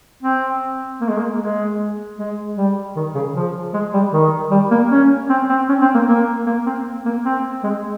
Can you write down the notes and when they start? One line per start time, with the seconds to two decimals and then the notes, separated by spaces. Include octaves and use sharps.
0.23 C4
1.01 A#3
1.10 G#3
1.18 A#3
1.40 G#3
2.18 G#3
2.57 G3
2.96 D#3
3.15 C#3
3.35 F3
3.74 G#3
3.93 G3
4.13 D#3
4.51 G3
4.71 A#3
4.91 C#4
5.30 C4
5.49 C4
5.69 C#4
5.81 C4
5.94 A#3
6.08 A#3
6.47 A#3
6.66 C4
7.06 A#3
7.25 C4
7.64 G#3